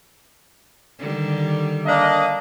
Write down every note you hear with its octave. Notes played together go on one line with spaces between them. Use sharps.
D3 D#3 G3
A#3 D4 D#5